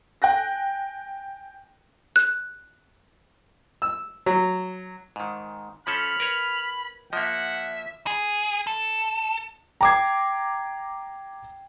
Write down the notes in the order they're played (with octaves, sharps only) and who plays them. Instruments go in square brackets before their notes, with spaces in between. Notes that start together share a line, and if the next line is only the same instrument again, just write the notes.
[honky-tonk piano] G5 G#5 F#6 A#6
[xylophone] F#6
[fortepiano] E6
F#3
[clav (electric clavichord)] G#2 D#3
[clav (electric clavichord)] F3 C#4 A4 [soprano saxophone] B5 [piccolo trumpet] F6
[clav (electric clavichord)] A#4 B4 C#5
[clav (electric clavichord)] F3 A#3 [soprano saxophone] E5 [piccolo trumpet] F#5
[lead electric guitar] G#4
A4
[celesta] G5 C7 [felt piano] A#5 D6 G#6